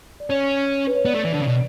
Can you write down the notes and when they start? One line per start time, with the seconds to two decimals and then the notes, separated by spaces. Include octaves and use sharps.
0.20 D5
0.29 C#4 C#5
0.87 B4
0.95 C#5
1.05 B3 D5
1.15 A3
1.25 E3
1.34 D3
1.41 C#3
1.48 B2